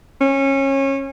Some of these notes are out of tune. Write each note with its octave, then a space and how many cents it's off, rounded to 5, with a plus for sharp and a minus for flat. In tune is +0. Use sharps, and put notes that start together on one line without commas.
C#4 -25